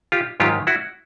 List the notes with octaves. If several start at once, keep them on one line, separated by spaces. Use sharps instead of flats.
F4 G4
G#2 D#3 F#3 F4 G4
E4 F#4